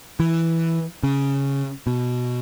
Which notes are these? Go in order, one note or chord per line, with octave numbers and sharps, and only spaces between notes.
E3
C#3
B2